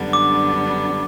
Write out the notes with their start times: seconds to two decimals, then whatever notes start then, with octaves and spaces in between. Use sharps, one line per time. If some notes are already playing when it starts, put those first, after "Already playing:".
Already playing: F#2 D3 G3 B3 D4
0.13 D6